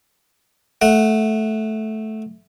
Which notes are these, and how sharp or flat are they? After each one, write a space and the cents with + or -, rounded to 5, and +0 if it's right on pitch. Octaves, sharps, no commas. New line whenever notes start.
A3 -10 F#5 +0